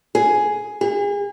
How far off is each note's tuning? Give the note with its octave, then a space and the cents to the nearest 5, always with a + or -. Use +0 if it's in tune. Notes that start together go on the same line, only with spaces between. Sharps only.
G#4 +5
G#4 -35